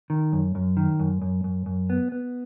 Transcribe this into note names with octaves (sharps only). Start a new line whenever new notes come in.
D#3
F#2
F#2
D#3
F#2
F#2
F#2
F#2
B3
B3